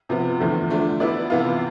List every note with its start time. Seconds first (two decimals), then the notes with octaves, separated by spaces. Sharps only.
0.09 C3 F3 B3
0.40 E2 D3 F3 A3
0.70 F3 A3 D4
1.00 F3 B3 E4 B4 D5
1.30 C3 E3 B3 F4